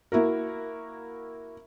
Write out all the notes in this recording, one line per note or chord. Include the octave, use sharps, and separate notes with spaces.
A#3 E4 F#4 A#4